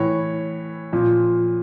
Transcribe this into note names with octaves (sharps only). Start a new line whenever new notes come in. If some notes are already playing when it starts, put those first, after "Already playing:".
Already playing: A2 E3 C#5
A#2 F3